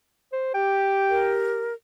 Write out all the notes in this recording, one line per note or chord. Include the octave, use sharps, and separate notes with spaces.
C5
G4 G5
A#4